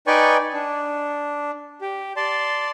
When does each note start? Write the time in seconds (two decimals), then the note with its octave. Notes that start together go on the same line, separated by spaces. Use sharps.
0.07 D#4 B4 D5 G5 G#5 C#6
0.54 D4
1.81 G4
2.16 D5 A5 C6